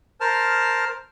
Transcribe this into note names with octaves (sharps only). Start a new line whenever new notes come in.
A#4 C5 A5 F6